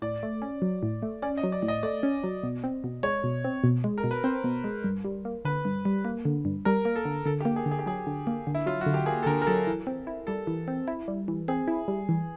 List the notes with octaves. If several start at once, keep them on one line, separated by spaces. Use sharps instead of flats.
A2 D5
A3
C#4
F#3
A2
A3
C#4 D5
D#5
F#3
D5
A2
D#5
A3 D5
C#4
F#3
B2
C4
B2
G#3 C#5
B2
C4
B2
G#3
A#4
B2
B4
C4 C5
B2
G#3
G2
G3
A#3
D3 B4
G2
G3
A#3
D3
G2
G3 A#4
A#3
A4
D3
D3 A4
G4
A#3
G#4
D3
G#4
G4
F#3 G#4
D3
A#3
D3
E4
F#3 F4
F#4
D3
G4
A#3 G#4
A4
D3 A#4
A#4
F#3 A4
E3
C4
E4
G3 A4
E3
C4
E4
G3
E3
C4 G#4
E4
G3
E3